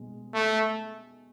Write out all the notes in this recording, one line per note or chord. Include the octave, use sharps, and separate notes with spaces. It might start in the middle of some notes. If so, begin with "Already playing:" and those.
Already playing: B2 G#3
A3